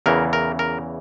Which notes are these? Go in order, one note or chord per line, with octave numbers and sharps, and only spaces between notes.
E2 C#3 E3 A#4
A#4
A#4